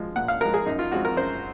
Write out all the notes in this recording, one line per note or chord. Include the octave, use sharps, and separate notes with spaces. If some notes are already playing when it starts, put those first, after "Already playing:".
Already playing: F3 G#3
A#2 F#5
F5
F3 G#3 A#4
G#4
F#2 D#4
F4
F3 G#3 C4 F#4
A#4
F#2 C5